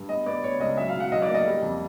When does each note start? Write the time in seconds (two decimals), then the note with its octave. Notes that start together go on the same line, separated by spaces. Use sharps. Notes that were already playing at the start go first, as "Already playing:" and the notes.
Already playing: G2
0.09 B3 D#5
0.26 B3 D5
0.44 B3 C#5
0.60 C#2 D#5
0.77 F#3 E5
0.89 F5
0.95 B1
1.00 F#5
1.11 B1 D#5
1.22 D5
1.29 A#3
1.34 D#5
1.46 G3
1.62 F2